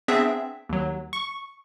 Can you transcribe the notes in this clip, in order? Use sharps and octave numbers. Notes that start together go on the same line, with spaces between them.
B3 C4 D4 G#4 E5
D#2 F#3
C#6